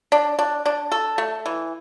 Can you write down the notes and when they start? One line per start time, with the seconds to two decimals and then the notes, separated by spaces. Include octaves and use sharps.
0.12 D4
0.39 D4
0.66 D4
0.92 A4
1.18 A3
1.46 E3